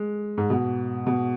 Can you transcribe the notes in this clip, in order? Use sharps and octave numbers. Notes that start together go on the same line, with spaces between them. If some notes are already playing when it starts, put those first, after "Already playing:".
Already playing: G#3
G#2
B2
B2